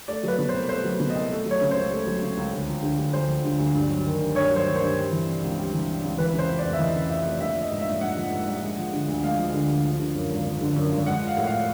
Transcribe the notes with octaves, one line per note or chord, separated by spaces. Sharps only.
A3 D5
F#3 B4
B2
C5
C2
A3 C5
F#3
B2
D#5
C2
A3
F#3
C#5
C#3
C#2 C5
A3
F#3
C#3
C#2
D2
F3
D3
D2
D2 C5
F3
D3
D2
G2
F#3
D#3
G2
G2 C#5
F#3
C5
D#3
C5
G2
G3
E3
C3
C#2
G3
E3
C3
C#2
E3 B4
C#3
C5
F2
D5
F1
E5
E3 D#5
C#3
F2 E5
F1
A#1 E5
F3
D#5
G#2
A#1 E5
A#1 F#5
F3
G#2
A#1
G#3
F3
D3
D2
G#3 F5
F3
D3
D2
F3
D3
F#2
G#1
F3
D3
F#2
G#1
G#3 F#5
F3
F5
A2
F5